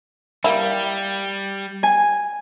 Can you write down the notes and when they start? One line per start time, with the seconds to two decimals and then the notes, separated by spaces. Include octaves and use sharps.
0.44 G3 A#3 E4
1.83 G#5